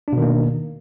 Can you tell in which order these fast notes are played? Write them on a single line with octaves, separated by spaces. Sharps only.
D4 B2 D#3 A#3